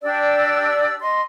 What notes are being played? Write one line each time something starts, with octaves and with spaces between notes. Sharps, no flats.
D4 G4 D5 E6
D#5 C6